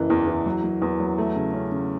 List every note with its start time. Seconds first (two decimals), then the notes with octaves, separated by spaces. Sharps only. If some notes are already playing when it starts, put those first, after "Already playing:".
Already playing: F#1 E3
0.10 E2
0.27 E3
0.46 F#3
0.64 F#3
0.82 E2
1.00 F#3
1.18 A3
1.36 C#3
1.54 C#4
1.72 C#3